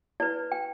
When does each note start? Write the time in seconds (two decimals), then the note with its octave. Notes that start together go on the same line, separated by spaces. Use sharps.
0.20 E4 B4 D5
0.52 G5